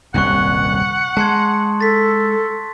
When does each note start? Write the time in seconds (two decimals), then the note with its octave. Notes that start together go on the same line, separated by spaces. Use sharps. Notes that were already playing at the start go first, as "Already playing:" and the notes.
0.14 D#1 C2 F#2 F#5 C#6 F#6
1.17 G#3 A5 C6 G#6
1.81 A4 A6 B6